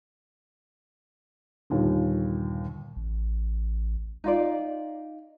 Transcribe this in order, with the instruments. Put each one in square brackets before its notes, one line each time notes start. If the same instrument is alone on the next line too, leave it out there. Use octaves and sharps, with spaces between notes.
[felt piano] G1 D#2 A#2
[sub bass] A1
[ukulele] D#4 F4 D5